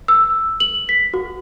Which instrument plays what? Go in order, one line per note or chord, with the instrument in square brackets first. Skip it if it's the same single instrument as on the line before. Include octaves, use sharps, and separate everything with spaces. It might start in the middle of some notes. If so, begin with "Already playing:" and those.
[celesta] E6
F#7
B6
F#4